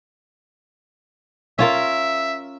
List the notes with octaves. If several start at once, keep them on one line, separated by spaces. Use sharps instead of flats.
C#4 F4 A#4 E5